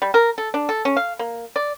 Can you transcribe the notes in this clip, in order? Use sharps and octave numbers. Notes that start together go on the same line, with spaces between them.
G3
A#4
A4
D4
A4
C#4
F5
A#3
D5